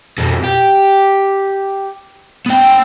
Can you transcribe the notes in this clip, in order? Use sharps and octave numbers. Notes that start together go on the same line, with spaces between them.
F2 B2
G4
B3 G5